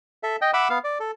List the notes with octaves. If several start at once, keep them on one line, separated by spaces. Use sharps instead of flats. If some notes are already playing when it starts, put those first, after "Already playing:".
A4 E5
D#5 G5
E5 F#5 B5 D6 E6
B3 F5
D5
A4